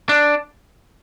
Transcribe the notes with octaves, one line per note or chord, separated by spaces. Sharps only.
D4